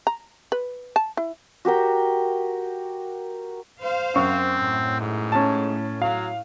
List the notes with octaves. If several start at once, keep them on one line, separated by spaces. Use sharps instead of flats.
A#5
B4
A5
E4
F#4 G4 A#4 G5
C5 F5
F#2 C4 C#6
A2
G#2
C#4 A5
F#3 F5